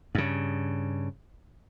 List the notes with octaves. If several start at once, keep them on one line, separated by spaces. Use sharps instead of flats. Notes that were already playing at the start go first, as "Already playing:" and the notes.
G2 C#3